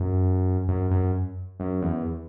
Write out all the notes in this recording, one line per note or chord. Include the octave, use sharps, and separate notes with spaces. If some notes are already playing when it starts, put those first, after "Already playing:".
Already playing: F#2
F#2
F#2
F#2
E2